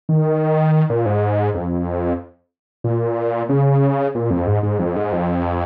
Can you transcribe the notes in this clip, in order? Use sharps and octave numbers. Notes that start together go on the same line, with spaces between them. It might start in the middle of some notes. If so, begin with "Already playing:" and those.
D#3
A#2
G#2
F2
A#2
C#3
A#2
F2
G#2
G#2
F2
G#2
F2